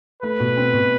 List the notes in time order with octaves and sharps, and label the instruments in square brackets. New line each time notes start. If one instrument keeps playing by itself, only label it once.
[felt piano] A3 [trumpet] B4
[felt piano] B2
C4
B2